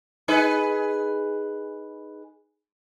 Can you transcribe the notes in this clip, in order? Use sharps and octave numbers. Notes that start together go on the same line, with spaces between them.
D#4 G#4 B4